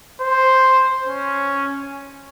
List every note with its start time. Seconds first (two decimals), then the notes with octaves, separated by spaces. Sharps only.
0.21 C5
1.07 C#4